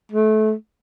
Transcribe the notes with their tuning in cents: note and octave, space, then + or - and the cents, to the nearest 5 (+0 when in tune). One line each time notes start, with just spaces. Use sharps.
A3 -25